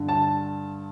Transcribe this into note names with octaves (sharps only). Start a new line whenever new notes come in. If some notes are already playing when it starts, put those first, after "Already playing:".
Already playing: G2 D3
A5